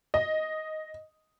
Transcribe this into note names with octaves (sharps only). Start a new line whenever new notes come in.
D#5